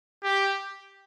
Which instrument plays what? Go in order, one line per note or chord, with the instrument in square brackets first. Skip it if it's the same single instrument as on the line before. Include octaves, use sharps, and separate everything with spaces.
[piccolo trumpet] G4